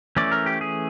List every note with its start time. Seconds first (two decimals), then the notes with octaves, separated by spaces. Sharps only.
0.16 E3 A3 C#4 D5
0.32 A#4
0.46 G4
0.61 G#4